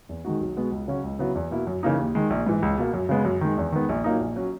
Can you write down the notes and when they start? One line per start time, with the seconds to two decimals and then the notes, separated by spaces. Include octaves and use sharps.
0.09 E2
0.25 D#3 G#3 D#4 F#4
0.41 B1
0.57 B2 G#3 B3 F#4
0.72 C#2
0.88 C#3 F#3 C#4 F#4
1.04 C#2
1.19 C#3 F#3 B3 E4
1.35 E2
1.51 B2 A#3 E4
1.67 F#2
1.83 C#3 E3 A#3 D#4
1.99 D#2
2.15 D#3 G#3
2.30 A#1
2.46 G#2 E3
2.62 C#2
2.78 B2 A#3
2.93 F#2
3.09 C#3 G#3 B3
3.25 F#2
3.41 D#3 G#3
3.58 E2
3.72 D#3 G#3 B3
3.89 A#1
4.04 A#2 F#3 A#3 D#4
4.20 A#1
4.36 F#3 C#4